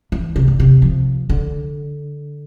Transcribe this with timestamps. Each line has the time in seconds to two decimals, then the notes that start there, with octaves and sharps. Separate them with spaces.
0.12 E3
0.36 C3
0.48 D3
0.60 C3
0.82 F3
1.29 D3